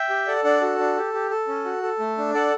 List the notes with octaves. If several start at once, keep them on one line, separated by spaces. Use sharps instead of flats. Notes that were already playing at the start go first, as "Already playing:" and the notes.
Already playing: E5 G5
G4
A4 D5 F#5
D4 D5 F#5
F#4 A4
D4
G4
G4
A4
C#4
F#4
A4
A3
D4
A4 D5 F#5